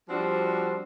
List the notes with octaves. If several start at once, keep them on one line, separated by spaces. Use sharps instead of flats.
F3 G3 C4 D4 F#4